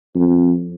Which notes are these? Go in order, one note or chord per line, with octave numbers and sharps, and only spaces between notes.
F2